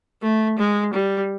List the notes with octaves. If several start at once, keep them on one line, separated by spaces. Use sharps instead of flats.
A3
G#3
G3